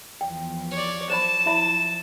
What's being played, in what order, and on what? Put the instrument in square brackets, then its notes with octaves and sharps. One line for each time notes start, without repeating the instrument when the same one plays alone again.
[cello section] E2 F3 [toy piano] G5
[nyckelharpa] C#5 D5
[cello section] F3 F#3 [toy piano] C5 C#5 B5 [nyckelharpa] A5 [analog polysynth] E7
[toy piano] E4 E5 B5